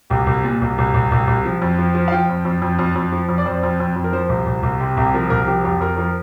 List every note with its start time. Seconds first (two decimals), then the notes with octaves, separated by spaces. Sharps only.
0.10 C2 G4
0.27 C2
0.44 A#2
0.61 C2
0.78 C2
0.94 C2
1.12 C2
1.27 C2
1.45 F3
1.62 F2
1.79 F3
1.95 F3
2.08 F5
2.12 F3 G5
2.29 F2
2.45 F2
2.62 F2
2.79 F2
2.95 F2
3.12 F3
3.29 F2
3.38 D5
3.46 F2 C5
3.63 F2
3.80 F2
3.96 F2
4.04 A#4
4.13 F3 C5
4.29 C2
4.47 C2
4.63 C2
4.80 C3 G4
4.97 C2 G4
5.14 F3 A#4
5.30 C2 A#4
5.47 F3 G4
5.64 F2 G4
5.80 F2 A#4
5.97 F3 A#4